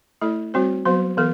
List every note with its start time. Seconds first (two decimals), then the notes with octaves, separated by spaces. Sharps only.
0.21 A3 E4 A4 D5
0.54 G3 C4 F#4 C5
0.85 F#3 B3 F#4 C5
1.17 E3 B3 A4